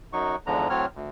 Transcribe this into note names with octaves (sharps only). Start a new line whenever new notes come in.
F#2 F#3 D#4 C#6
E2 G#2 D3 F3 A#5
A2 F#3 C4 C#5 F6
D2